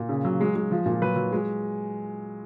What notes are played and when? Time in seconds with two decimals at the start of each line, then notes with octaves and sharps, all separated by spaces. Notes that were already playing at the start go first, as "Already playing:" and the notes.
Already playing: A#2
0.09 C#3
0.25 F#3
0.41 G#3
0.56 G#3
0.71 F3
0.86 A#2
1.02 F#3 B4
1.16 F#3
1.32 G#3